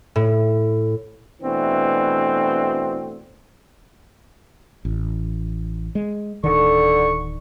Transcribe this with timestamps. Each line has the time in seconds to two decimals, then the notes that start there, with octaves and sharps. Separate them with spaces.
0.16 A2
1.43 B2 E3 A3 C4 D4 F#4
4.85 A1
5.95 G#3
6.44 D1 D3 D#3 C#6